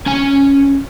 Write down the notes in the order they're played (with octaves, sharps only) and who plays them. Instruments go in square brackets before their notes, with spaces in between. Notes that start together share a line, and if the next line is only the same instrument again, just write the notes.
[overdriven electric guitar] C#4 G#5